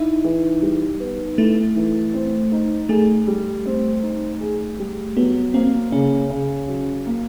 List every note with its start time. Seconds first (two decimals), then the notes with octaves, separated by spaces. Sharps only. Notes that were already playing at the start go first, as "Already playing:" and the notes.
Already playing: D#4 E4
0.24 E3
0.62 G3
1.00 B3
1.38 A3 E4
1.76 E3
2.14 C4
2.52 D#4
2.89 A3 G#4
3.27 G3
3.66 C4
4.03 D#4
4.41 G#4
4.79 G3
5.16 F#3 B3
5.54 A#3 C4
5.92 C#3 C#4
6.30 C#3
6.68 F#3
7.06 A#3